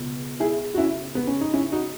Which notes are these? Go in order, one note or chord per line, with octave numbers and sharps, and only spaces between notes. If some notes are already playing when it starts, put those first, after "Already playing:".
Already playing: C#2 B2
E4 G#4
F#4
C#4 E4
B3
C#4
D#4
C#4 E4
D#4 F#4